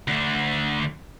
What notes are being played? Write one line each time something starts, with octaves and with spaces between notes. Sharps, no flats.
D2 D3